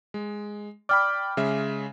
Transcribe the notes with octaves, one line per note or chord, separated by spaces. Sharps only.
G#3
D5 G5 B5 D6 F6
C#3 G#3 E5